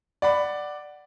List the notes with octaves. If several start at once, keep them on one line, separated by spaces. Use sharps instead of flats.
D5 F#5 B5